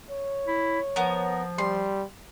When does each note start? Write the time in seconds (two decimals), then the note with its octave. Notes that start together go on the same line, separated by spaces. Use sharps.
0.10 C#5
0.48 E4
0.96 F3 B3 A#4
1.58 G3 C6